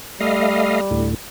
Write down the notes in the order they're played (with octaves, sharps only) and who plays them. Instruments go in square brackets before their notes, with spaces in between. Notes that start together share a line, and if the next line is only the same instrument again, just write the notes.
[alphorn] G3 [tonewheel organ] A3 D#5 F5
[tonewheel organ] D2 A2